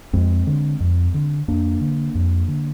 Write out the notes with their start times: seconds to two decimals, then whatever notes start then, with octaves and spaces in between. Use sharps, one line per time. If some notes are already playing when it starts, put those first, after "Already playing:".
0.13 F2 G#3 C4
0.47 D3
0.80 F2
1.14 D3
1.48 F2 A#3 D4
1.81 D3
2.15 F2
2.48 D3